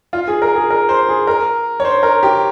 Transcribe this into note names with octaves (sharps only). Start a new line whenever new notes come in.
F4
G#4
A#4
G#4
A#4
C5
G#4
A#4
C#5
C5
A#4
G4